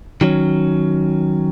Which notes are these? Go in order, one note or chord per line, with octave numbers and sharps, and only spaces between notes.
D#3 F#3 C#4